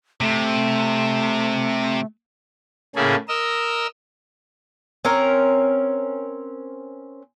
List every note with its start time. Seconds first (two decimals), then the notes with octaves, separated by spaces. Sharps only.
0.21 C3 A3
2.96 A2 C#3 A#3 C#4 G#4 A4
3.29 A#4 D#5 E6
5.05 C4 C#4 A#4